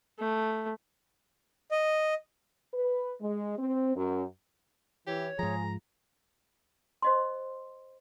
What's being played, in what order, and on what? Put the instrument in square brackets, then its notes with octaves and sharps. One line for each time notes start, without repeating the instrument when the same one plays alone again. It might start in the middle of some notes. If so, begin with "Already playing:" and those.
[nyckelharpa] A3
[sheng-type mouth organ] D#5
[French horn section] B4
G#3
C4
F#2
[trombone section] E3 [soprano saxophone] G4 [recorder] C#5
[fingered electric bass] G#2 F3 [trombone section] F4 G#4 [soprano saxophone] A#5
[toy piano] C5 D#5 C6